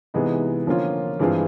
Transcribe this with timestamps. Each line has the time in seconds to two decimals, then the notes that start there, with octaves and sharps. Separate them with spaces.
0.14 C3 E3 G#3 B3 D#4
0.67 D3 F3 A#3 C#4 F4
1.20 G2 E3 G#3 C4 F4